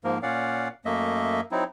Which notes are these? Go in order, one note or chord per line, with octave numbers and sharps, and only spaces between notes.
G#2 F3 A#3 A#4
A#2 C#4 D5 F5 F#5
F#2 A3 A#3 D#5 E5
F#3 C4 D#4 E4